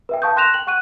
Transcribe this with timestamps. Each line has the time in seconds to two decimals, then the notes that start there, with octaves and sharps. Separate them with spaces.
0.09 B4 E5 G5
0.22 F5 A5 C#6 D#6 G6
0.36 G5 C6 F#6 A#6 E7 F7
0.54 G5 F#7
0.67 F#5 C#6 F#6 D#7